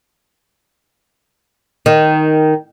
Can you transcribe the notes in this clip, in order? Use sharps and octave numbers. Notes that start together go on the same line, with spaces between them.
D#3